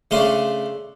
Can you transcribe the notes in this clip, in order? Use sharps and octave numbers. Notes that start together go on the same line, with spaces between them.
C#3 A3 C#4 D4 C6